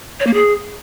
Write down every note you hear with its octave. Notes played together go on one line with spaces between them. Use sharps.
C#5
A#3
G#4